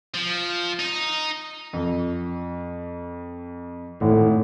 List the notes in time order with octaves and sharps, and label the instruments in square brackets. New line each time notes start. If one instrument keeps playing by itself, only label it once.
[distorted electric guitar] F3
D#4
[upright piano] F2
[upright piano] G#1 [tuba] A2